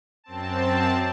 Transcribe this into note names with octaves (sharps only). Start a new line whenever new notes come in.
F#2 C4 A5